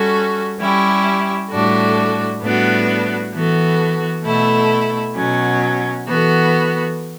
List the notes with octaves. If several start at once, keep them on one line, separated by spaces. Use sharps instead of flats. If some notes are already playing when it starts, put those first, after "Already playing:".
Already playing: G3 C#4 F#4 A4
G3 C#4 E4 G4
A2 G3 D4 F#4 A4
A2 G3 B3 D4 F#4
E3 B3 F#4 A4
B2 A3 E4 A4
B2 F#3 C#4
E3 B3 F#4 A4